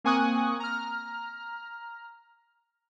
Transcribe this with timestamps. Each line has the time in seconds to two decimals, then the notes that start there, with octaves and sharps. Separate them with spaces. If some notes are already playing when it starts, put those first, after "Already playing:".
0.04 A#3 C4 G#5 C#6 D#6 F#6
0.60 A#5 F6